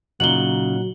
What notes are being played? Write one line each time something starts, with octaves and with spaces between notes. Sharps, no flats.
A#2 C#3 F#3 D#4 F#5 F#7 G7